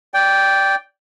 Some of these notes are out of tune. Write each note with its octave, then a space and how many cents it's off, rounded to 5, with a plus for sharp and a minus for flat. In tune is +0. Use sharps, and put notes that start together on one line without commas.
D5 -15 G5 +0